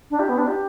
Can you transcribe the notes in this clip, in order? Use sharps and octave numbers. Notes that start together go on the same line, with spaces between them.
D4
G4
B3
D4
G4